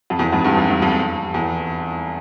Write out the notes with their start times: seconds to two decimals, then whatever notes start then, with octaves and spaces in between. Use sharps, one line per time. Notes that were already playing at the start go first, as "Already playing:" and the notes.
0.10 F2
0.19 E2
0.32 F2 G#2
0.44 E2 G2
0.57 F2
0.70 G2
0.82 F2
1.34 E2